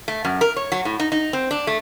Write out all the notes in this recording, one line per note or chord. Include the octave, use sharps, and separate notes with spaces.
A3
F#2
A#4
C#5
F#3
A2
D#4
D#4
C4
D4
A3